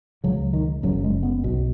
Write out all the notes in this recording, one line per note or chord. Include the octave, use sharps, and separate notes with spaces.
C#2 C#3 F#3
D#3
F#1 F#2 C#3 F#3
G#3
B3
B1 B2